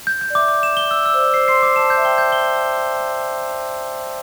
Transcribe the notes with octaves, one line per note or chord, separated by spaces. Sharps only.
G6
G6
D5
E5 D6
D6
E7
G7
E6
E6
C5
D5 D6
C5 C7
C6 C7
C6 D6
A5 E7
G6
E5
G5 G7
G6
G7